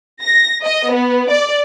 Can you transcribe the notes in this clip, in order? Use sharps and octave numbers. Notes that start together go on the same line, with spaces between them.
A#6
D#5
B3
D5